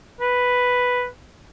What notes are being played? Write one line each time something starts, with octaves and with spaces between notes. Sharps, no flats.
B4